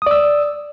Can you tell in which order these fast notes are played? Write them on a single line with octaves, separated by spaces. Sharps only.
D#6 D5 E6